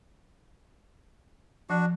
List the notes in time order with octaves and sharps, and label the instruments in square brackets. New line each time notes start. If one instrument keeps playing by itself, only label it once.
[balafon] F3 [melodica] D4 F#4